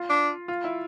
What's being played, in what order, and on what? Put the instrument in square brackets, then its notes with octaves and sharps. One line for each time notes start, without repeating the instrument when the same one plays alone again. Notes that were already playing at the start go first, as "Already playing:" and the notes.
Already playing: [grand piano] F4
[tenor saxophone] D4
[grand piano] F4
E4